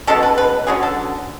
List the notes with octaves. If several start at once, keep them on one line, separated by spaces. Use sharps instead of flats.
B2 G#3 C#4 A4
B4
B4
D3 F#3 C#4 G#4
A4